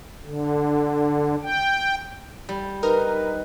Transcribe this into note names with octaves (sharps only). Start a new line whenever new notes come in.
D3
G5
G3
D#4 A#4 B4